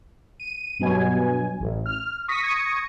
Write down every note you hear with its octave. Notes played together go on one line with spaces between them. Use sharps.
D#7
G2 B2 F#3 G#5
A1
F6
C#6 D#6 A#6 B6
C#6 D#6 G#6 A#6 C#7